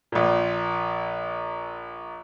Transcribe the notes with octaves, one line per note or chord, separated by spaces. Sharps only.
A#1 A#2